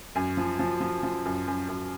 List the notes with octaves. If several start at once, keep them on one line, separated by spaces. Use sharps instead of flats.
F#2 G#5
F3
F3
F3
F3
F#2
F#2
F#2